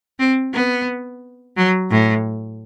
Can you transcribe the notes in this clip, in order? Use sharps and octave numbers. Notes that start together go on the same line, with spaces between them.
C4
B3
F#3
A2